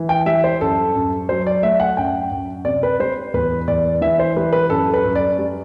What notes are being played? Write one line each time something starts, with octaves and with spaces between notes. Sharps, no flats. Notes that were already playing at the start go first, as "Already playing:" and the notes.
Already playing: E3
G5
G3 E5
C5
F#2 A4
F#2
F#3 C5
D5
A3 E5
F#5
F#2 G5
F#2
C3 D5
B4
G3 C5
E2 B4
E2 D5
E3 E5
C5
G3 B4
B4
F#2 A4
B4
F#2
D5
G3